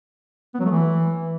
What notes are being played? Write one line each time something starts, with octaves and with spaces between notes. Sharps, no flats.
B3
F#3
A3
E3